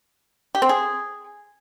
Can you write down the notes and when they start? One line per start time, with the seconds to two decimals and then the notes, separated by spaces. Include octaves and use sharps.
0.55 G4
0.62 C4
0.69 G#4